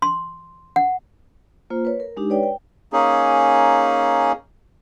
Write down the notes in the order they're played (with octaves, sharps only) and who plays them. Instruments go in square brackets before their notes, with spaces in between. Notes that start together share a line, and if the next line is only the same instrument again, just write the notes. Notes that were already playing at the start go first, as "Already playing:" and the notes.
[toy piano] C6
F#5
[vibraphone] A#3 F4 C5
B4 C#5
A#4
G#3 D4 D#4 G4
B4 C#5 D5 G5
G5
[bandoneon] A#3 C#4 D#4 G#4